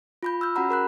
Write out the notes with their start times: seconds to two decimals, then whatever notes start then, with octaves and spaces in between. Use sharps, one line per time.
0.23 F4 B5 G6
0.41 E6 F6 G6
0.56 C#4 F#4 F#5 A#5 B5
0.69 G#4 A#4 B5 F#6